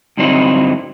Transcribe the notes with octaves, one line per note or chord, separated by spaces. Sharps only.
G2 D3 F#3 C4 D#4 E4